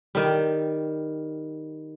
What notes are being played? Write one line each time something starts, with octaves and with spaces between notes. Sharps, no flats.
D#3 G3